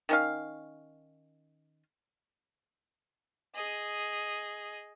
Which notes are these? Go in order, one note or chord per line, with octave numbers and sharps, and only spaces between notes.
D#3 C#4 F5
G#4 D#5